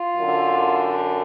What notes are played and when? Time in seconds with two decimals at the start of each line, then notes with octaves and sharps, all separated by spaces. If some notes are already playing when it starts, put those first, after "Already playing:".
Already playing: F4
0.15 F#2 D3